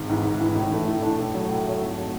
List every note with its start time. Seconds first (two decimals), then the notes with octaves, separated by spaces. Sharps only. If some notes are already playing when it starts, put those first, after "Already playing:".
Already playing: G#1
0.09 G#2 E3
0.25 G#1
0.40 G#2 E3
0.55 A2
0.71 E3 A3 D4
0.87 A2
1.02 E3 A3 D4
1.18 A2
1.33 F#3 A3
1.49 A2
1.65 F#3 A3
1.80 G#1
1.98 F#3 A3